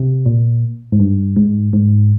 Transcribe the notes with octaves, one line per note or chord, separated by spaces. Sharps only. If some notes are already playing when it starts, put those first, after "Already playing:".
Already playing: C3
A#2
G#2
G2
G#2
G#2